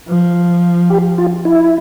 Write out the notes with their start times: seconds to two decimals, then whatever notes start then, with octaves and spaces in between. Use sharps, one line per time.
0.08 F3
0.90 G4
1.18 F4
1.45 E4